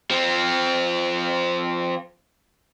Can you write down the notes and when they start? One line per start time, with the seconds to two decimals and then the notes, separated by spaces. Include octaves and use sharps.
0.10 F3 C4